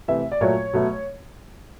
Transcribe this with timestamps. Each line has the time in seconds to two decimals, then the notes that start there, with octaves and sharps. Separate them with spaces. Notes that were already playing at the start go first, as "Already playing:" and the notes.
0.08 C3 E3 A3 E5
0.32 D5
0.41 A#2 F#3 A3 C#5
0.73 B2 F#3 A3